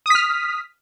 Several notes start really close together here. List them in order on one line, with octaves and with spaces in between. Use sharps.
D#6 B6 F6